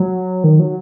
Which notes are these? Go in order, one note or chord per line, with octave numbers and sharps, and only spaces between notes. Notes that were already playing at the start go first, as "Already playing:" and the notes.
Already playing: F#3
D#3
F#3